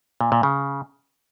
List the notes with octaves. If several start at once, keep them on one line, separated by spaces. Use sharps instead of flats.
A#2
A#2
C#3